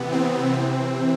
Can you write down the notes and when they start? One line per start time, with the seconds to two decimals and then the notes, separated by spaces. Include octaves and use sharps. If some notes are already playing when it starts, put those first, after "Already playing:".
Already playing: C3 E3 B3
0.12 C4
0.53 C3 E3